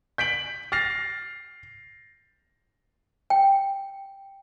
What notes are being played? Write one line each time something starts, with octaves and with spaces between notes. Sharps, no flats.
G6 B6 D7 F#7
F6 A6 A#6 C7 F7
G5